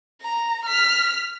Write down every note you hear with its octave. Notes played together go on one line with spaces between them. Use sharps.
A#5
F6 B6